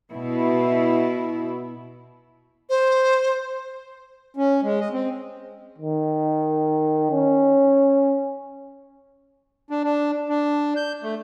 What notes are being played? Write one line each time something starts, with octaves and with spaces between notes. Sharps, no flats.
B2 E4
C5
C#4
G#3
D#5
C4
D#3
C#4
D4
D4
D4
G6
A3